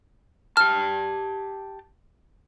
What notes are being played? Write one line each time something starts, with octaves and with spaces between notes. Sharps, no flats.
G4 A5 F6